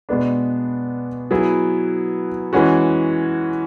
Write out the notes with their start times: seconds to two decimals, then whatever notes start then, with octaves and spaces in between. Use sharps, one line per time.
0.09 B2 G#3 B3 D4
1.31 F#3 B3 E4 G#4
2.53 E3 G#3 C#4 F#4